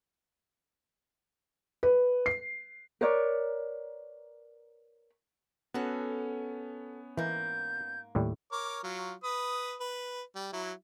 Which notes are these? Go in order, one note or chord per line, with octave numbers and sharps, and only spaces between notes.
B4
C7
A#4 B4 C#5 D5
B3 C#4 F#4 A4
G#2 E3 A#3 G6
D#2 A2 G3
A#4 C#5 D6
F#3 F4
B4 D#6
B4
G3
F#3 E4